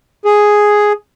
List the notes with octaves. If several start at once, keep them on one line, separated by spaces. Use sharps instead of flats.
G#4